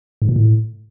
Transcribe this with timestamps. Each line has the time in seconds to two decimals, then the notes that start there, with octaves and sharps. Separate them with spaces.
0.22 G#2
0.29 A#2
0.36 A2